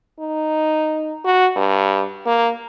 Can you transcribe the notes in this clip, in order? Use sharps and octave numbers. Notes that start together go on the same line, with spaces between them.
D#4
F#4
G2
A#3